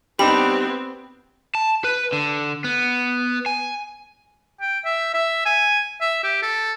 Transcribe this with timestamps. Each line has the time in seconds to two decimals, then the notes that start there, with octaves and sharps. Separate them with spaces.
0.19 G3 B3 C4 D4 D#4 G4 B5
1.55 A5
1.84 B4
2.13 D3
2.64 B3
3.46 G#5
4.61 G5
4.85 E5
5.14 E5
5.46 G#5
6.01 E5
6.24 G4
6.42 A4